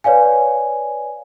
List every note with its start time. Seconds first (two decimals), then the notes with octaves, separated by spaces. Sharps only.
0.04 B4 C#5 D5 F5 G#5